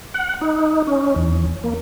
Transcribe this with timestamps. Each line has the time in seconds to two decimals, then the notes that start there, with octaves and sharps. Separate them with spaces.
0.14 F#5
0.41 D#4
0.87 C#4
1.16 E2
1.64 A#3